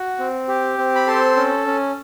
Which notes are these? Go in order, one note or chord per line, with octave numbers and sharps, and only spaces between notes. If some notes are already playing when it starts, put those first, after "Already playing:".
Already playing: F#4
C4
G4
C4
B5
A4 C5 C6
C#4
C#4